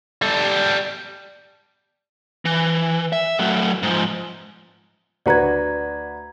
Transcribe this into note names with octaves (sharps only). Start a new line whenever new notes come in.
G3 A4
E3
E5
F#3 A3
G#2 F3
D2 F#4 B4 D5 A#5 G#6